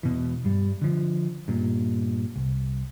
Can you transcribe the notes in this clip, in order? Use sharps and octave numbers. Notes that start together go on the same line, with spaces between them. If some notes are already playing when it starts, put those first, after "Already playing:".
E2 B2 E3
G2 G3
D3 F3
G2 A#2
C2